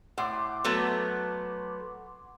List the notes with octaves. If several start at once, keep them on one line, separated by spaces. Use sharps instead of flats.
A2 F#5 C6 D6
F#3 A3 B3